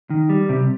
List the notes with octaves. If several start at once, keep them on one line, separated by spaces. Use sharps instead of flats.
D#3
G3
C3